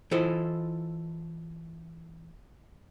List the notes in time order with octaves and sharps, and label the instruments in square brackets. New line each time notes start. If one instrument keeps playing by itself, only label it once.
[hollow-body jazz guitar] E3 E4 F4 A4 C5 D#5